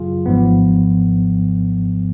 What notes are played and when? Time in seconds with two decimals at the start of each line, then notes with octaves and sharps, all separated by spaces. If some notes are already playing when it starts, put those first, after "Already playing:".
Already playing: F#2 C#3 F#3 F4 G#4
0.26 G#1 G#2 F3 B3